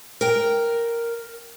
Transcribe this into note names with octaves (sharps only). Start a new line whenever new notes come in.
A#4 G5